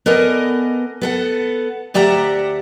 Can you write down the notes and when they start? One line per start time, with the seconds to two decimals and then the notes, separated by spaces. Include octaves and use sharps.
0.06 B3 A4 A#4 D5 D#5 G#5
1.01 B3 A4 F#5
1.94 D2 G4 D5 E5 F#5 A#5